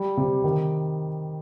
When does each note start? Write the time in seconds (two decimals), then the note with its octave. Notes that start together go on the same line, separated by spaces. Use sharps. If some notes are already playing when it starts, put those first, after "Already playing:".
Already playing: G3
0.17 C3
0.44 D#3